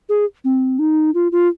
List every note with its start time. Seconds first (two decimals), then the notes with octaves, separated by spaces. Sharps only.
0.09 G#4
0.44 C4
0.79 D#4
1.14 F4
1.32 F4